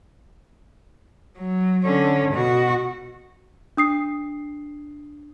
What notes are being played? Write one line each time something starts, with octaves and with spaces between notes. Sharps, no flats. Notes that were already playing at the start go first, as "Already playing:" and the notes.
F#3
D3 C#4
B2 F#4
D4 D#6 C7